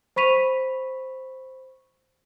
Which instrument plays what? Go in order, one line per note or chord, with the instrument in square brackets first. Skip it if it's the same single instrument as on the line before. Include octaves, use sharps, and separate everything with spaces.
[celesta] C5 B5 C#6 B6 D#7 F7